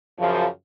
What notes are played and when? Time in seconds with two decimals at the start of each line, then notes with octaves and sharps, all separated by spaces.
0.17 F#2 C#3 F3